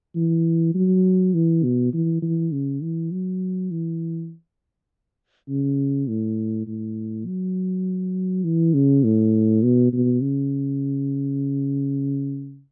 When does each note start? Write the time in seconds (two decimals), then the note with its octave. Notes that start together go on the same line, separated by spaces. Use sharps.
0.15 E3
0.74 F#3
1.34 E3
1.63 B2
1.93 E3
2.22 E3
2.52 C#3
2.82 E3
3.12 F#3
3.71 E3
5.49 C#3
6.08 A2
6.67 A2
7.26 F#3
8.44 E3
8.74 C#3
9.04 A2
9.63 B2
9.92 B2
10.21 C#3